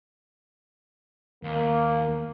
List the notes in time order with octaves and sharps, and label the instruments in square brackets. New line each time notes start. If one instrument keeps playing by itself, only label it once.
[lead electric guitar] D#2 [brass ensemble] A#3